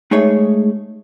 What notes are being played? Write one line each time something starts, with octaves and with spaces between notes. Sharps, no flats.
G#3 A3 D#4 G#4 C#5 E5